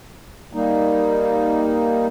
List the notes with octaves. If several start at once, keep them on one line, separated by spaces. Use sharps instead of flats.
G3 A#3 D#4